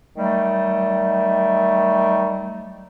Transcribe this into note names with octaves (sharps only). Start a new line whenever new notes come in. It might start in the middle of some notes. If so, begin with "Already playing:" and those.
D#3 F#3 G3 A3